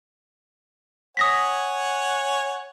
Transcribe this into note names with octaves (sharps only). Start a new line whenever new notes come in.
C#5 F#5 G#5 D#6 A#6 B6